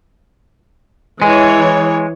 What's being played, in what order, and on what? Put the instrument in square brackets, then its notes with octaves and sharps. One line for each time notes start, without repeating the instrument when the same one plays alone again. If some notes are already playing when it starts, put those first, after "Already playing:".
[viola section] E3 C#5 [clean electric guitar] G#3